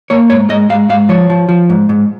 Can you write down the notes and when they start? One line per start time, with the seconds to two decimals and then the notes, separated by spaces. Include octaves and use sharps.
0.10 A#3 C#5
0.30 G#2 C#5
0.50 G#2 D#5
0.69 G#2 F5
0.89 G#2 F5
1.09 F3 C#5
1.30 F3
1.49 F3
1.70 G#2
1.89 G#2